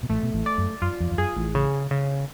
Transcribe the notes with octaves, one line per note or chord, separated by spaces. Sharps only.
B2
A1 A2 A3
B2
A1 A2
D5
F#2
F#2 F4
F2
F2
F#2 G#4
A1 A2
C#3
C#3